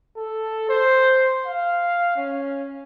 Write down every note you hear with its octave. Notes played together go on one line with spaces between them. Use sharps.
A4
C5
F5
C#4